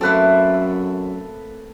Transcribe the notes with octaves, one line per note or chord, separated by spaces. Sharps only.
F#2 A3 A#3 C4 A4 B4